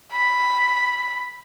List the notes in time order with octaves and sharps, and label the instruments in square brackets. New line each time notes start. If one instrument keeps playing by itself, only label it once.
[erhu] B5